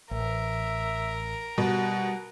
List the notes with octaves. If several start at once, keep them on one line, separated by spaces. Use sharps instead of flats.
A1 A#4 E5
B2 G3 F#5